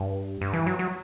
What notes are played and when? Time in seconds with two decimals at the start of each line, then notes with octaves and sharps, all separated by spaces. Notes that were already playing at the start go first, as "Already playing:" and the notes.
Already playing: G2
0.41 G2
0.53 E3
0.66 F#3
0.79 F#3